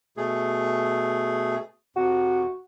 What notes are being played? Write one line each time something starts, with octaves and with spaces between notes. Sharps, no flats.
B2 A3 G#4
F2 C3 F#4